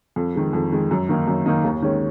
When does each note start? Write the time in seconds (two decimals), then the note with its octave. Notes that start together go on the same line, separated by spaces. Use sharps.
0.16 F2
0.36 D#3 G#3
0.53 F2
0.72 D#3 G#3
0.91 F#2
1.09 D#3 A#3 D#4
1.28 F#2
1.46 D#3 A#3 D#4
1.64 D#2
1.82 D#3 G#3 C#4